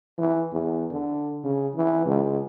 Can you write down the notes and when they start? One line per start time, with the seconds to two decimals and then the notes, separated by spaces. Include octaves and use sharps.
0.18 E3
0.52 E2
0.91 D3
1.44 C#3
1.75 E3
2.05 C#2